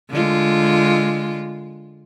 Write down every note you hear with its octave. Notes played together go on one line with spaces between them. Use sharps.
D3 G#3 F4